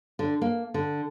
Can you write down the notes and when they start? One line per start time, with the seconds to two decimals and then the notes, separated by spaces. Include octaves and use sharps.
0.19 D3
0.42 A#3
0.74 D3